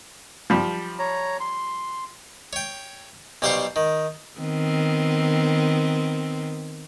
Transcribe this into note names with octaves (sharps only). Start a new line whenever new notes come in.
F3 G3
C#5 A#5
C6
C#5 G5
B1 G3 G4 C5 F5 C#6
D#3
D#3 B3 C4